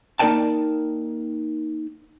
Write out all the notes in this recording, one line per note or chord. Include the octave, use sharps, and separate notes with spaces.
A#3 D#4 A#4 D5 G5 A5